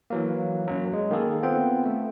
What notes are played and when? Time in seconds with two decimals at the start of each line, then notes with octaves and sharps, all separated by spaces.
0.10 E3 F#3 A#3
0.67 F#2 F#3
0.93 G#3
1.11 D#3 A#3 G#4 A4
1.43 B3 C4 F4 G5
1.85 A3